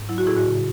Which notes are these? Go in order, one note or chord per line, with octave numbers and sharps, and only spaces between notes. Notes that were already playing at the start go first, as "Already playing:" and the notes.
Already playing: G#2
F#3 E4
F#4
A2 E4 G#4
F#4
C#3